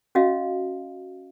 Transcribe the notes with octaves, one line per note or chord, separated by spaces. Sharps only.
C#4 F#4 D#5 F5